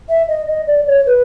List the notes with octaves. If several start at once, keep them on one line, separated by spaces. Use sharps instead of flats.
E5
D#5
D#5
D5
C#5
B4